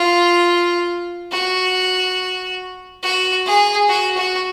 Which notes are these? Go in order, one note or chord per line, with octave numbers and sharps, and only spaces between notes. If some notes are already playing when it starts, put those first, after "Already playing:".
Already playing: F4
F#4
F#4
G#4
F#4
F#4